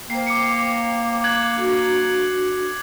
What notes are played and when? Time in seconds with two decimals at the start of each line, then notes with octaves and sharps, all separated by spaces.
0.10 A#3 C5 G5 C7
0.27 D6 C7 C#7
1.24 F#6 G#6 F#7
1.56 D4 F#4 A4